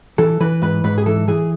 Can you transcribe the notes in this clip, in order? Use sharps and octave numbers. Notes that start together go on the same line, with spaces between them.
E3 A4
E3 B4
G#2 B4
G#2 B4
G#4
E3 A4
E3 G#4